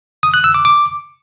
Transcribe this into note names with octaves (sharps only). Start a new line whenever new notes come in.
D#6
F#6
E6
D6
D6